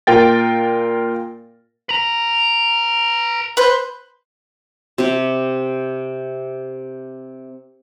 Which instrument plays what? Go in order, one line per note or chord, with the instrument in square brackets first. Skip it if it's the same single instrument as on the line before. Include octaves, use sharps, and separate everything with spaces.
[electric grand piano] A#2 F4 A#4 G5 A6
[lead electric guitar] B4 A#5
[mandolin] B4 C5
[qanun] C3 G4